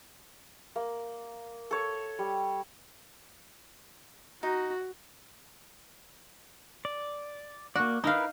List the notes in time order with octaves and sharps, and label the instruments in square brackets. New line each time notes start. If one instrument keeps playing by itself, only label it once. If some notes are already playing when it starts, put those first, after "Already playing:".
[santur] A#3
A4 C#5
G3
[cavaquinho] D#4 [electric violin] F#4
[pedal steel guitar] D5
[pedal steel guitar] A#3 D5 [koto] F#4
[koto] D#4 F5 [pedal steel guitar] E4 A#4 B4